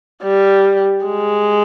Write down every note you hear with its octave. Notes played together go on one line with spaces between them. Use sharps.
G3
G#3